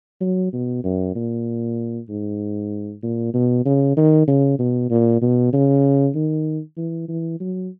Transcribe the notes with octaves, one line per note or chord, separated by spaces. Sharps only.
F#3
B2
F#2
A#2
G#2
A#2
B2
C#3
D#3
C#3
B2
A#2
B2
C#3
D#3
E3
E3
F#3